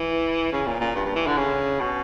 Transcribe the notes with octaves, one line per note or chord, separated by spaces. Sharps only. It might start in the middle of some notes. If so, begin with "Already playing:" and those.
Already playing: E3
C#3
A#2
A#2
G2
G2
E3
D3
C#3
B2